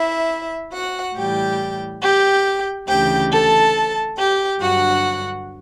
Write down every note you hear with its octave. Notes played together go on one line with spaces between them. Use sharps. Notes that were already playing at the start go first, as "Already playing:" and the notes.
Already playing: E4 E5
F#4 F#5
A2 E3 G3 G4 G5
G4 G5
D2 C#3 E3 G4 G5
A4 A5
G4 G5
G2 D3 F#3 F#4 F#5